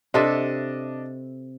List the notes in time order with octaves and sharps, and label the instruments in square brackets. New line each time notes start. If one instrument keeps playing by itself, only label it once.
[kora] C3 A4 E5 [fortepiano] D4 D#5